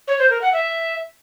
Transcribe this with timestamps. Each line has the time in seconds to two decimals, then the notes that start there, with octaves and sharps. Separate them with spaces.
0.08 C#5
0.19 C5
0.30 A#4
0.42 F#5
0.53 E5